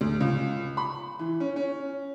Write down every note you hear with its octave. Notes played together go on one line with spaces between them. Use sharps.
D2
C#2
B5
E3
C#4
C#4